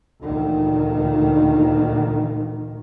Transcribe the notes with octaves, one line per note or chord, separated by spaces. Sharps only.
D2 A#2 D#3 E3